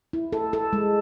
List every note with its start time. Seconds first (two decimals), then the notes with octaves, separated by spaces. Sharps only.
0.13 E4
0.33 A4
0.53 A4
0.73 G#3